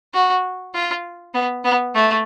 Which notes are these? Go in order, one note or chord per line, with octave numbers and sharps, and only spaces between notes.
F#4
F4
B3
B3
A3